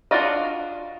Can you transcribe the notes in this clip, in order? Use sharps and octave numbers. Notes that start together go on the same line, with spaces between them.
D4 F4 F#4 D5 D#5